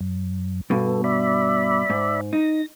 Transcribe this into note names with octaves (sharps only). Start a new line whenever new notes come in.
F#2
G2 B2 B3 A4
D5 E5 B5
G#2
D#4 A#6